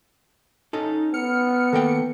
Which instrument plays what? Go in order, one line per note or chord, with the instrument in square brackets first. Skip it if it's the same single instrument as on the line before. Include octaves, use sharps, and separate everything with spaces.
[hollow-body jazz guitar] C#4 A4 [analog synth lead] D#4
[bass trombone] B3 [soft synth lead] F6 [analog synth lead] C#7
[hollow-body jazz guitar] D#3 A#3 G5 [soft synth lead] A4